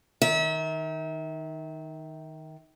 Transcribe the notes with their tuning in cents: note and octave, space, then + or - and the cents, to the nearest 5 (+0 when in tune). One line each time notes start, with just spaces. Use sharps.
D#3 +0 E5 -35